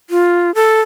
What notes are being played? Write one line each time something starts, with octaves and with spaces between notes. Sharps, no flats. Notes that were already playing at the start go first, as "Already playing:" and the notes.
F4
A4